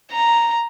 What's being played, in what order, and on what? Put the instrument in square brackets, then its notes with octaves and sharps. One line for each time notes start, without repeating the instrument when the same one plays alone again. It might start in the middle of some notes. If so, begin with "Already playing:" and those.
[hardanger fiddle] A#5